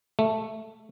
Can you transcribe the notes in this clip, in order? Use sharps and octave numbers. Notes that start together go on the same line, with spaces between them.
A3